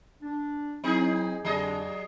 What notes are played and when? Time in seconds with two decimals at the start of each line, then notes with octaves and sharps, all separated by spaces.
0.23 D4
0.84 F#3 C4 D#4 E4 G#4
1.45 F2 D3 F#3 D4 G#4 D#5